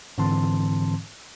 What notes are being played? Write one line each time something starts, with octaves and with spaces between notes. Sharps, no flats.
G#2 D3 E3 C4 A5 C6